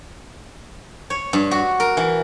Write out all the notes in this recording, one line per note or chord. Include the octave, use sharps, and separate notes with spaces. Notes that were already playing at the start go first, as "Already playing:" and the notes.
C#5
G2
F#4
A#4
E3